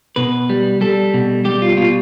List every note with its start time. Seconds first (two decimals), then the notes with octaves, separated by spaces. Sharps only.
0.16 B2 B4
0.50 G3
0.81 G3 A4
1.14 B2
1.45 G3 G4
1.62 F4
1.77 B2 F4